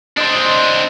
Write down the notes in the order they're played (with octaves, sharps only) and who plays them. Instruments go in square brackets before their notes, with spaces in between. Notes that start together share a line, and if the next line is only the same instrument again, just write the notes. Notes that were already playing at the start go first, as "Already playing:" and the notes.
[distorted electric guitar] C4 D4 [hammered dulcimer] C5 D#5